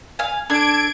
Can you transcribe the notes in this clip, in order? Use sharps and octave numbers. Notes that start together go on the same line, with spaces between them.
F5 G#5
D4 A4 G#6 D7